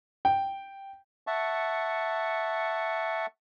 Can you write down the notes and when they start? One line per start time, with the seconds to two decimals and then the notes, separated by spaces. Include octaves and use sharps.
0.25 G5
1.27 E5 F#5 A5 C#6